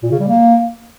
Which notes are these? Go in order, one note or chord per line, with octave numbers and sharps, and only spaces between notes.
A#2
C#3
G3
A#3